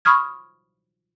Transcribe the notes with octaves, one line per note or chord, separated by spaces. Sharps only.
B5 C#6 D#6 F6 G#6